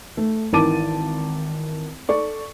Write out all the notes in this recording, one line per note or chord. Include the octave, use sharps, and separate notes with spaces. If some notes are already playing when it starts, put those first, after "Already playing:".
A3
G#1 D#3 E3 A5 D6 D#7
A4 D5 C#6